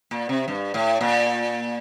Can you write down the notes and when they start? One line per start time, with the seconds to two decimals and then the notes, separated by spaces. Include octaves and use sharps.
0.11 A#2
0.29 C3
0.48 G2
0.74 A2
1.01 A#2